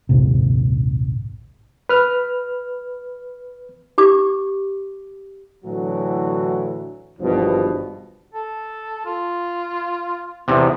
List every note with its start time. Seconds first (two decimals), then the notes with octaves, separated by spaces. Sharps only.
0.09 A#1 D#2 G#2 C3
1.89 B4 F6
3.98 G4 D6
5.65 A2 D3 E3 F#3 F#4
7.19 G#1 G2 B2 E3 F3
8.34 A4
9.06 F4
10.48 E2 C3 B3